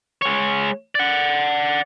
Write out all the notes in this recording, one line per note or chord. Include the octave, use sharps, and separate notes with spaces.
G#3 C#5
D5 F#5